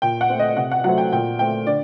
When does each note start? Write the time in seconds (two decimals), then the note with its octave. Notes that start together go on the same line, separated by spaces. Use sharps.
0.02 A#2 G5
0.21 F#5
0.30 A3 C4
0.39 D#5
0.57 C3 F#5
0.71 F#5
0.84 F#3 A3 C4 F#5
0.98 G5
1.12 A#2 G5
1.39 A3 C4 G5
1.67 D3 D5